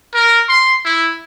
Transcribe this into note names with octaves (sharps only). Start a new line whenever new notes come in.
A#4
C6
E4